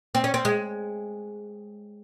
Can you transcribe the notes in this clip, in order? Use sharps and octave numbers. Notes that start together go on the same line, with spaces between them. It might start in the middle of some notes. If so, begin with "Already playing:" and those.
C4
C#4
C4
G#3